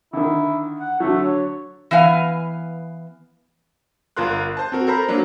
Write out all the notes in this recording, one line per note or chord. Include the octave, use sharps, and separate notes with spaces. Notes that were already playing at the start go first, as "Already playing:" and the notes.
D3 D#3 E4
F#5
D3 F#3 A3
C#5
E3 B3 F5 G#5
G1 F4 A#4 C6 F#6
C5 A5
C4 F#4 A#4
A4 A#4 C5 A#5 B5
F#3 A#3 D4